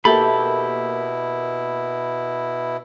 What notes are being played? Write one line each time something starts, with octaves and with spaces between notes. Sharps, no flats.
B2 A#3 E4 G4 A4 E5 B5